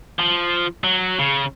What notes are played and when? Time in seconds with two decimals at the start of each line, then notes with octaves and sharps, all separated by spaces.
0.19 F3
0.84 F#3
1.20 C#3